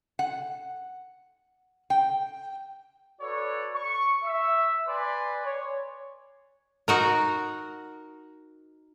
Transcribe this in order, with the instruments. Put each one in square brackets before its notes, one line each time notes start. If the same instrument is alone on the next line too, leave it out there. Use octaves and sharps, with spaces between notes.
[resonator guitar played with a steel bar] F#5
G5
[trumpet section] F#4 A4 B4 C#5 D5
C#6
E5
B4 D5 G#5 C6
C#5
[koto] D#4 F#4 A#4